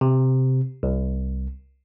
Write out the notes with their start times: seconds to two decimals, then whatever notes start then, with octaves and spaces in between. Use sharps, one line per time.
0.01 C3
0.83 C2